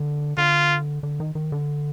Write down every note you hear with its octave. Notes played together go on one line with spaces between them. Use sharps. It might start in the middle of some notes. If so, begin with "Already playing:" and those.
Already playing: D3
D3 F4
D3
D#3
D#3
D3